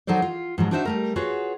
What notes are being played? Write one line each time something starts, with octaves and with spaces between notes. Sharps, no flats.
F#3 D#4 A4 C5 D5
F4
G#2 F3 F#3
D4 D#4 F#4 C5 C#5 E5
G3 A3 A#4
F4 F#4 G#4 B4 C#5